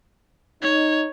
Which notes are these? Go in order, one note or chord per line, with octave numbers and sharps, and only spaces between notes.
D#4 C#5